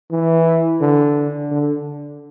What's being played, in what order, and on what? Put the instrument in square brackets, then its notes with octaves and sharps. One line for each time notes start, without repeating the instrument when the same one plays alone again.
[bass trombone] E3
D3
D3